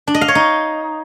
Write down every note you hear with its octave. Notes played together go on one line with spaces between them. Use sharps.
D4
D#5
F5
C#5
D#4